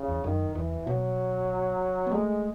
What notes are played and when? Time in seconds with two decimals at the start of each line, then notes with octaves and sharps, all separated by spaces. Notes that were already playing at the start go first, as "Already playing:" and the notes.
Already playing: C#3
0.09 E2
0.24 F#2 D#3
0.55 E2 E3
0.86 B2 F#3
2.07 B3
2.12 G#3 A3